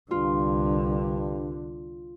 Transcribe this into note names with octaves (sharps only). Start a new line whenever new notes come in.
C2 G2 D3 F4